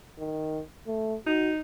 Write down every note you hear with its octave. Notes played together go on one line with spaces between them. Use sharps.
D#3
A3
D#4 F#4